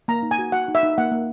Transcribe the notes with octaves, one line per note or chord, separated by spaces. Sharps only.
A#3 A#5
D#4
G#5
F#4
F#4 F#5
D#4
E5
D#4
A#3 F#5
A#3